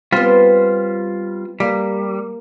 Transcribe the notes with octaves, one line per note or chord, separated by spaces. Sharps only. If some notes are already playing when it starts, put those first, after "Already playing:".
G3 B3 C4 F4
G3 A#3